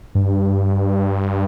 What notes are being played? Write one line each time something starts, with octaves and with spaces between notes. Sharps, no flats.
G2